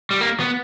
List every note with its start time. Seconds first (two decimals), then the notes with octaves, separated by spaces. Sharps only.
0.11 G3
0.21 A#3
0.40 B3